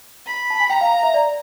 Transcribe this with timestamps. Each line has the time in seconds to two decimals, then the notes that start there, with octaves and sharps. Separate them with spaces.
0.26 B5
0.50 A5
0.60 G#5
0.70 G5 A#5
0.81 F5
0.92 F5
1.03 E5
1.14 D5